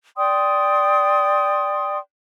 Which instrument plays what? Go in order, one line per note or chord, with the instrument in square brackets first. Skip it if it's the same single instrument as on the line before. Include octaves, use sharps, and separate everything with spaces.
[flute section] D5 G5 C6 D#6